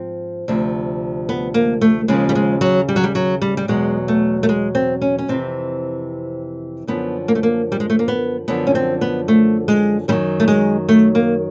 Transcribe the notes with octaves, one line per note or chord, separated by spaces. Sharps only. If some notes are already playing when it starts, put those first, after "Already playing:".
Already playing: G#2 F3 C4
D2 C3 F3
B3
A#3
A3
D#2 C#3 F3 G#3
G3
G#3
F#3
G3
F#3
G3
F#3
G3
G3
E2 B2 F#3 G#3
A3
A3
G#3
C4
C#4
C#4
F2 C3 E3 C4
F#2 D3 F3 B3
A#3
A3
A#3
G3
G#3
A3
A#3
B3
F#2 D3 F3 B3
C#4
C4
B3
A3
G#3
F#2 D#3 F#3 G3
A3
G#3
A3
A#3